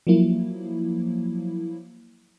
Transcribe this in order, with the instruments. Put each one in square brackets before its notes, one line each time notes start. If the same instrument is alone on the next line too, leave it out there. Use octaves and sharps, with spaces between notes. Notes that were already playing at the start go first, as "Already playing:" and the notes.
[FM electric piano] F3 F#3 A#3 E4